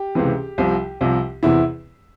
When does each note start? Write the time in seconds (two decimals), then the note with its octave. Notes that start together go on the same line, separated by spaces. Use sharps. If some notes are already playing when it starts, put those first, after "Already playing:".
Already playing: G4
0.15 C#2 C3 E3
0.58 C2 C3 F3
1.01 C2 C3 F3
1.43 E2 C3 E3 E4